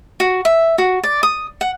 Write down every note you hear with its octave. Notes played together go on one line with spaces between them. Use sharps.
F#4
E5
F#4
D5
D#6
F#5